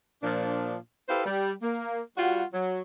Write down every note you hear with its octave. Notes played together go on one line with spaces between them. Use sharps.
A#2 F3 D4
E4 G4 A4 B4 C5 F5
G3
A#3
G3 F4 F#4
F#3